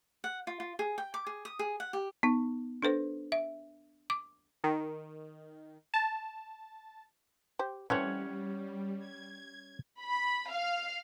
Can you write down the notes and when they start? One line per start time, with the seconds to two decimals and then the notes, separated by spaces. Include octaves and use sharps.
0.24 F#5
0.47 F4
0.60 F4
0.79 G#4
0.98 G5
1.14 D6
1.27 G#4
1.45 D#6
1.59 G#4
1.80 F#5
1.93 G4
2.23 B3 D#4
2.82 D4 A4 B4 C5
3.32 E5
4.10 D6
4.64 D#3
5.94 A5
7.59 G4 C5
7.90 E3 G3 A3 C4 C#4 C#5 F#5
8.98 G#6
10.02 B5
10.53 F5